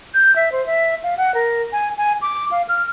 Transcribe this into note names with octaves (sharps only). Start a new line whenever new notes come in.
G6
E5
C5
E5
F5
F#5
A#4
G#5
G#5
D6
F5
F6